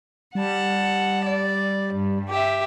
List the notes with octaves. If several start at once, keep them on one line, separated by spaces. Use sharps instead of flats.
G3 F#5 A5
D5
G2
G4 E5